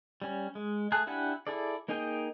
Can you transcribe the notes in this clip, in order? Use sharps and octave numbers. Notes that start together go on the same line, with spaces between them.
G3 C#4
G#3
A3 G#4 G#5 A5 F#6
D4 E4 G4 F#5 G#5
E4 G#4 A4 D5
A#3 D#4 G#4 D#5 G5